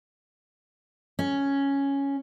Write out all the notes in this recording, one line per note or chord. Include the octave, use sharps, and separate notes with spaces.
C#4